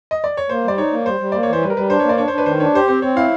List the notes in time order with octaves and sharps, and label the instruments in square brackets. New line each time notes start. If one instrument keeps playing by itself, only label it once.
[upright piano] D#5
D5
C#5
[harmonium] A#3 [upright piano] C5
[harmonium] G3 [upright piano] D5
[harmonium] D#4 [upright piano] C#5
[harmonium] A#3
[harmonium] G3 [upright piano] C5
[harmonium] G3
[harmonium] A#3 [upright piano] D5
[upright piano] C#5
[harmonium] E3 [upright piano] C5
[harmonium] G3 [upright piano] B4
[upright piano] A#4
[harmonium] G3 [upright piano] B4
[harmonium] D4 [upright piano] C5
[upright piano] C#5
[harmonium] A#3
[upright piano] D5
[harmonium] D4 [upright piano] C#5
[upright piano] C5
[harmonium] D4
[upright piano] B4
[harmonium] D#3 [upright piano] C5
[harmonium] D4 [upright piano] C#5
[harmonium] G4 [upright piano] C5
[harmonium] C4 [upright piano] C5
[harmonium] C4 [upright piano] C#5
[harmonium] E4 [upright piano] F5